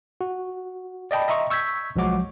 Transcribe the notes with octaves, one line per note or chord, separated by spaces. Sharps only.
F#4
D5 D#5 G5 A5 B5
D#5 E5 A#5 C6 C#6
C#6 E6 G6 G#6 B6
B1 F3 F#3 G#3 F#4 D6